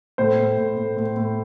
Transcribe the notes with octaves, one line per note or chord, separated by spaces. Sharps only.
A2 C5
A2
A2
A2
A2
A2